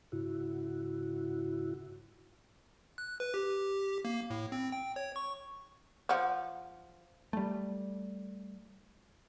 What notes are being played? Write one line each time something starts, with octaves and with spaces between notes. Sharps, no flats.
G#2 C#3 E4 F#4
F#6
B4
G4
A#3
A2
C4
G5
C#5
C#6
F3 F#5
G3 A3